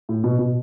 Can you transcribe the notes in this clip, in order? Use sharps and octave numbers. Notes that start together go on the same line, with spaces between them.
A2
B2
B2